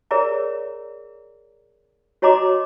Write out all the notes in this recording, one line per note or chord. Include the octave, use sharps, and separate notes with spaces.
G#4 A#4 C#5 D5 E5 A#5
F#4 C#5 D#5 A#5 C6 D6